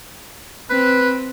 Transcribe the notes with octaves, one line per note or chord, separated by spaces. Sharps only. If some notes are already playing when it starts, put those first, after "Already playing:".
C4 B4